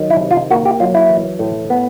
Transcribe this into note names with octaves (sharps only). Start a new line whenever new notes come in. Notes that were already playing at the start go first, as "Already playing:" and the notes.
Already playing: D#3 F#3
E4
C3
F4
A#3 F#4
G4
F#3 F4
E4
E3
A2
B3